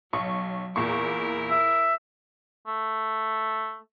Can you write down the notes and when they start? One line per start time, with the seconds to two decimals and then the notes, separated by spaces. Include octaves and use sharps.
0.13 B1 F#3 C#6
0.76 E2 A#2 E4 A#4 C#6
1.51 E5
2.67 A3